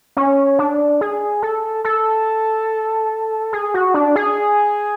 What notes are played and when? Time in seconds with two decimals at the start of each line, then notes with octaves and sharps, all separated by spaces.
0.17 C#4
0.59 D4
1.01 G#4
1.42 A4
1.84 A4
3.53 G#4
3.74 F#4
3.94 D4
4.16 G#4